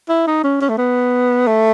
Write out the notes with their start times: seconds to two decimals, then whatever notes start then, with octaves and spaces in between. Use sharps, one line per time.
0.09 E4
0.27 D#4
0.44 C#4
0.61 C#4
0.69 A3
0.78 B3
1.47 A3